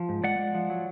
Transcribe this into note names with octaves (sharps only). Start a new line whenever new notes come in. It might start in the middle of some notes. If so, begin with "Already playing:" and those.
Already playing: F3
G#2
G#3 D5 F#5
G#3
F3
F#3